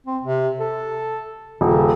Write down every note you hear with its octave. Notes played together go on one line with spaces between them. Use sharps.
C4
C3
A4
D#1 C#3